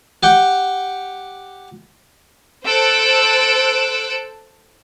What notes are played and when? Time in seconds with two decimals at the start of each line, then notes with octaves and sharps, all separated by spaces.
0.23 G4 F#5 G5
2.65 A4 C5 E6 F#6 D7